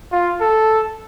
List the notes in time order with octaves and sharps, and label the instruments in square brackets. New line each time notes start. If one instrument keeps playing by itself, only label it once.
[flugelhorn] F4
A4